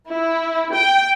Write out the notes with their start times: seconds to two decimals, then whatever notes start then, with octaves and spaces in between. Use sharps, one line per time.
0.12 E4
0.74 G5